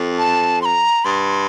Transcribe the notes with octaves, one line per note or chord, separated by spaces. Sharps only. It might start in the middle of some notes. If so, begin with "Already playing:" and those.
Already playing: F2
A5
C6
A#5
G2 C6